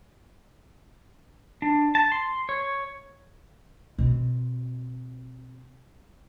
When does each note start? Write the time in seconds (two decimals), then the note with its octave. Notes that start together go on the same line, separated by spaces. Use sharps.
1.62 D4
1.95 A5
2.12 C6
2.49 C#5
3.98 B2 C4